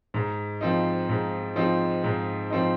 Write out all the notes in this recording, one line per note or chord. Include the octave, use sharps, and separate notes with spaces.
G#2
F3 C4 D#4
G#2
F3 C4 D#4
G#2
F3 C4 D#4